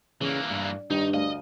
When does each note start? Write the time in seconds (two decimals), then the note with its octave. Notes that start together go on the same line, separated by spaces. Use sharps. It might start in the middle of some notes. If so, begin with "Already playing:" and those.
0.21 C#3 E3 A#3
0.50 G2
0.90 G2 D#3 G3 D#4
1.14 D2 D#5 F5